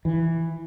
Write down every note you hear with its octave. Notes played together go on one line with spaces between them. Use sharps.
E3